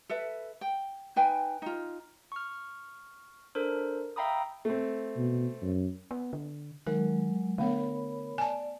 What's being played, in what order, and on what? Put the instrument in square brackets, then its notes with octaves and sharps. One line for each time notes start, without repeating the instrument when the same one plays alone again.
[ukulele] A4 B4 E5
G5
D#4 B4 G5 G#5
D#4 F4
[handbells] C#6 F6
D4 A4 A#4 C5
E5 F5 G5 A#5 B5 D#6
[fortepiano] A3 C4
[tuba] B2
F#2
[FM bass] B3
D3
[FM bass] D#3 [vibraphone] F#3 G#3 [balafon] A#4
[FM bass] D3 [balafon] A3 B3 [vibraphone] A#4 C#5 B5
[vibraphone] D5 [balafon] G#5 A5